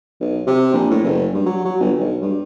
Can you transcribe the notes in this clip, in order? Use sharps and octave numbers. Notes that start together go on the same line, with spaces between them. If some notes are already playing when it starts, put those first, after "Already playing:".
B1
C3
A#1
A2
F#1
G2
F#3
F#3
G1
B1
G2